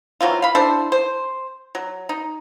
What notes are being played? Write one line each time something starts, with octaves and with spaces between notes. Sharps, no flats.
E3 F#3 C4 F4
F5 B5
D4 E4 A4 C5
C5
F#3
D#4